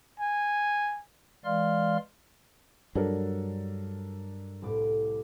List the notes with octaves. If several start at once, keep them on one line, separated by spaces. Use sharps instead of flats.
G#5
E3 G#3 D5 F5 C6 F6
G2 F#3 D4 A4 A#4
C2 A2 D6